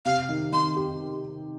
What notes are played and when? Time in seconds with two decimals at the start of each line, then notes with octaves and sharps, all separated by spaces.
0.05 C3 F5
0.29 D#3
0.52 D#3 C6
0.76 G4